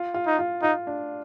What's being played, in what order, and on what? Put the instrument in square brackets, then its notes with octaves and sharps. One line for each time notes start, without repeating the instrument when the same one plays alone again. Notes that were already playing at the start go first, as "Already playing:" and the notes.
Already playing: [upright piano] F4
F4
[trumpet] D#4
[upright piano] F4
[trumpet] D#4 [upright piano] F4
[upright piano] D4